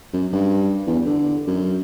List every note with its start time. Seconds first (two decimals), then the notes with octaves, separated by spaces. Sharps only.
0.14 F#2
0.33 G2
0.87 E2
1.06 D3
1.47 F#2